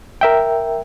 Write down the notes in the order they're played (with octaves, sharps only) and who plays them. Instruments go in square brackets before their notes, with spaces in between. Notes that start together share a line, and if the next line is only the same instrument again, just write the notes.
[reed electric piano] A#4 E5 G5